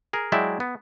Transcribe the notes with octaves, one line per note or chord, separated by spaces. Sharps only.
G#4 A#4
F#3 G#3 E4 D5 E5 G5
B3